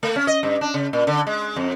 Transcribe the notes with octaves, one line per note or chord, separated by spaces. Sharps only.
A3
C#4
D#5
G2
D4
C#3
A#2
D3
G#3
F2